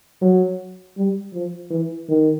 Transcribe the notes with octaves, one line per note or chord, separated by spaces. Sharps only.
F#3
G3
F3
E3
D#3